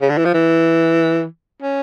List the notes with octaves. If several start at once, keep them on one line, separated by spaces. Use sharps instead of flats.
C#3
D3
E3
F3
E3
C#4